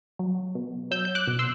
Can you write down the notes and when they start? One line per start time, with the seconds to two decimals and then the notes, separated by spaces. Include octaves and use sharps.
0.19 F#3
0.55 B2
0.91 F#3 E6 G6
1.05 G6
1.15 D6 F#6
1.27 B2
1.39 C6 E6